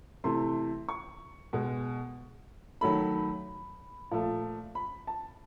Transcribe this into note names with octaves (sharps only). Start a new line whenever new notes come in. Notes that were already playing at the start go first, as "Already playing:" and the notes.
C3 E3 A3 C6
C#6
B2 G#3
D#3 F#3 A3 B5
A#2 F3 A3
B5
A5